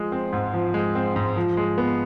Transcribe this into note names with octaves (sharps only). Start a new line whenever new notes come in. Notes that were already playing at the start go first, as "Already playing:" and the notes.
Already playing: F3 G#3
C4
G#2
F3
G#3
C4
G#2
F3
G#3
B3